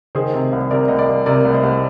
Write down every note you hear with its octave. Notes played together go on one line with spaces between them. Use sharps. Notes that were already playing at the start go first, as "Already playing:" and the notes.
D#3 G#4 C5
C3
C2
C3 A#4 D5
C2 D#5
A#4 D5
C2
C3 A#4 D5
C2
C5 D#5
C2